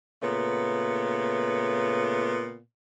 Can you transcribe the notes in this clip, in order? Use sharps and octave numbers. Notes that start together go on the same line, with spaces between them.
A#2 C#3 A3 B3